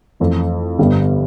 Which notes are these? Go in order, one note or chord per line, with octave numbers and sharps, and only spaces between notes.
F2 E3 A3 E4
G1 G2 D3 G3 B3